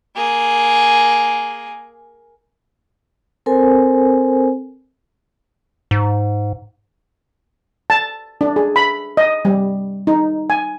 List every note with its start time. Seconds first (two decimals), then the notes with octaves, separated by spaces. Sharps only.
0.16 A#3 G#4
3.46 C4 A4 A#4 C5 G#5
5.91 G#2
7.90 A5
8.41 D4
8.56 G#4
8.76 B5
9.17 D#5
9.45 G3
10.07 D#4
10.50 G#5